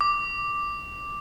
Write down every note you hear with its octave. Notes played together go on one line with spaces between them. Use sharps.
D6